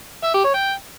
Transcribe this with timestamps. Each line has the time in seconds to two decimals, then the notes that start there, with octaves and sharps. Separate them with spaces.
0.24 E5
0.34 G4
0.44 C#5
0.54 G5